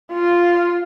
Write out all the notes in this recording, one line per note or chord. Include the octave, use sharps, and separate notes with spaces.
F4